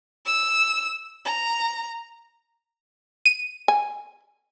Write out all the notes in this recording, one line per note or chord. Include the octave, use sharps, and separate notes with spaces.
E6
A#5
D#7
G#5